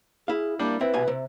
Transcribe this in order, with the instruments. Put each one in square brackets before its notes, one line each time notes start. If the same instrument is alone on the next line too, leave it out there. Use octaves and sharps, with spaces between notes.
[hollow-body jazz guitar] E4 F5 [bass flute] G#4
[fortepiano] G3 D4 [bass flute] A#3
[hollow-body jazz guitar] C4 [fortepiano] E4 [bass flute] B4
[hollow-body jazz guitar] C2 B2 G#5
C3